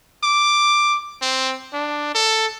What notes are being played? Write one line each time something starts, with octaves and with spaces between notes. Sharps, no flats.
D6
C4
D4
A4